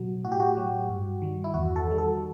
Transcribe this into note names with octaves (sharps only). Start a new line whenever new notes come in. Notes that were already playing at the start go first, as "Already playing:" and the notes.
Already playing: B2 F#3 F#4
A2 F#4
G4
F#4
F#3
G2
D#3 G3
E4
E2 F#4
A4
D#3 G3
A4